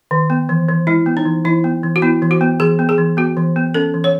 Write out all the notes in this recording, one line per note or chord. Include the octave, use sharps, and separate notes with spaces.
D#3
B3
E3
E3
G#3 E4
B3
D#4
E3
E3 E4
B3
E3
F#4
B3 E4
E3
F#4
B3
E3 G#4
B3
G#4
E3
B3 F#4
E3
B3
C#4 A4
E3
C#5